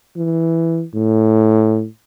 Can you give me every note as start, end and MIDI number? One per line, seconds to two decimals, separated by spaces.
0.17 0.83 52
0.94 1.86 45